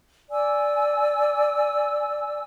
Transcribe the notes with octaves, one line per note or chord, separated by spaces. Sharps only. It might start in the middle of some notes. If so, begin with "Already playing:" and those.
D5 G#5 E6